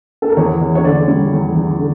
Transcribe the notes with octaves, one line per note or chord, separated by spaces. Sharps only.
A4
A#4
E2 C#5
E2
C#5
D3 D5
G3
E2
E2
D3